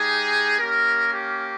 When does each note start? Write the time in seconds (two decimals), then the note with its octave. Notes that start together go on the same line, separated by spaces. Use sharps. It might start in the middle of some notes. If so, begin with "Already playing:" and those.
Already playing: G#3 D#4 G4 G#4
0.59 A#3 C#4 G4 A#4
1.13 G4